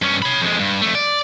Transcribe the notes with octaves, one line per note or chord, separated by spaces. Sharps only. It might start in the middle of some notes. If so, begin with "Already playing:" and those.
G2 C#4
C#5 B5
F2 G#3
G2
F2 A3
D5